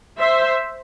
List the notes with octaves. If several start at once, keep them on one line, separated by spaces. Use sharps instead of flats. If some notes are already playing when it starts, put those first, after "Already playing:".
C5 E5